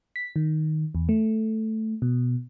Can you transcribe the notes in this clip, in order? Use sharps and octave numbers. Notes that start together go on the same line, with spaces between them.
B6
D#3
E2
A3
B2